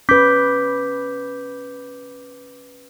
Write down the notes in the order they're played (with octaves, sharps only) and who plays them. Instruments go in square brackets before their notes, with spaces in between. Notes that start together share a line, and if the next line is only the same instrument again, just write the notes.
[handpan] C#4 B4 [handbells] D6 G6 B6